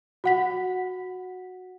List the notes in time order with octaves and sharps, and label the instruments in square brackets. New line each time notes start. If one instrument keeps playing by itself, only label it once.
[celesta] F#4 F#5 B6